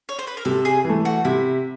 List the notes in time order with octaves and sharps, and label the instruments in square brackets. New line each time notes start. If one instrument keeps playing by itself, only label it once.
[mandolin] C#5
C5
B4
A#4
[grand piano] C3 [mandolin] A4
[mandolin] G#4
[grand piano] E3
A3
[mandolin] F#4
[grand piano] C3 [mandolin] E4